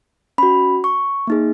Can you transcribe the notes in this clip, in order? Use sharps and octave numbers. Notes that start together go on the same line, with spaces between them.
C#4 F#4 B5
C#6
A#3 D#4 G#4